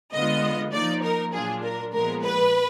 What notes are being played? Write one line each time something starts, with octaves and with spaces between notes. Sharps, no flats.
D3 G#3 B3 F4 D#5
F3 A#3 D#4 D5
A#4
A#2 F#3 D4 F4 G#4
A#4
A#2 F3 G#3 B3 A#4
B4